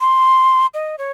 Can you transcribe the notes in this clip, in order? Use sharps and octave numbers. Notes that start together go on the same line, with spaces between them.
C6
D#5
C#5